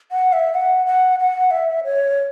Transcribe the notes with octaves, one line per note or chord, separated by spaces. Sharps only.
F#5
E5
F#5
F#5
F#5
E5
C#5